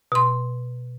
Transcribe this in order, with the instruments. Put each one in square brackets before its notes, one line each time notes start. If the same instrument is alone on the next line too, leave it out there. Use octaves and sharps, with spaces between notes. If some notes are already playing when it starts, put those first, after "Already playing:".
[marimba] B2 C6